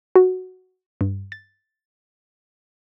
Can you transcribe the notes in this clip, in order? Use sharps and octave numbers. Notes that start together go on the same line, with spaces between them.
F#4
G2
A6